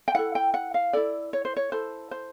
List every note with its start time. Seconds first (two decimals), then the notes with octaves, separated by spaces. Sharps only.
0.08 G5
0.15 E4 A4 F#5
0.35 G5
0.54 F#5
0.74 F5
0.93 E4 A4 D5
1.33 C#5
1.45 C5
1.57 C#5
1.72 E4 A4 C5
2.11 C5